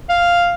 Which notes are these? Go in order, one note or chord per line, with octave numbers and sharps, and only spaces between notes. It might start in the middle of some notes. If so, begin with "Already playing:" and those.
F5